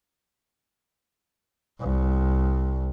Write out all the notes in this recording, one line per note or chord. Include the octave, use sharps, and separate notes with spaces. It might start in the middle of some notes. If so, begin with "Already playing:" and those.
C2